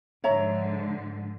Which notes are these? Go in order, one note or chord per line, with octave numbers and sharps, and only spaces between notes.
G#2 D3 F3 C#5 E5 A#5